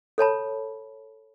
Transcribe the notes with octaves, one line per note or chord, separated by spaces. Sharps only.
A4 C#5 A5 B5